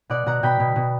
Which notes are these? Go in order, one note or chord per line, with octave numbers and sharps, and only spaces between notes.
B2 D5 F#5
B2 F#5 A#5
B2 G5 B5
B2
B2